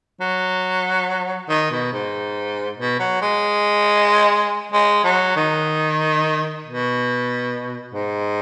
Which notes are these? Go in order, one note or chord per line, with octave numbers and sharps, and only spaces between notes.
F#3
D#3
B2
G#2
B2
F#3
G#3
G#3
F#3
D#3
B2
G#2